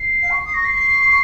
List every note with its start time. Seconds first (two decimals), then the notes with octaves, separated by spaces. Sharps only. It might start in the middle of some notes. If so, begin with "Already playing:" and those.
Already playing: C7
0.22 F5
0.31 C#6
0.46 D#6
0.54 C#6 A#6
0.65 C7
0.76 C7
0.87 C7